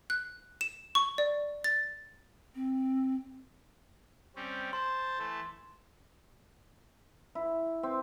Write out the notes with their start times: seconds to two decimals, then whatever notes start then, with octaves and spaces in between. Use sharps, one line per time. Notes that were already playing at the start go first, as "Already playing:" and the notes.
0.10 F#6
0.61 E7
0.95 C#6
1.18 D5
1.64 A6
2.55 C4
4.35 G3 C4 C#4
4.73 C5 A5 C6
5.19 E3 A3 A4
7.35 E4
7.83 C4